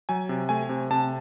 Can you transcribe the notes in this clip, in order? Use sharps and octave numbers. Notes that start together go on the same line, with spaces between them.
F#3 G#5
C3
A3 G#5
C3
C3 A5